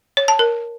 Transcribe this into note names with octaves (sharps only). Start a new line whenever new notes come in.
C#5
A5
A#4